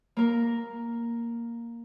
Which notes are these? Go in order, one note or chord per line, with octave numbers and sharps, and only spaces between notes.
A#3 A#4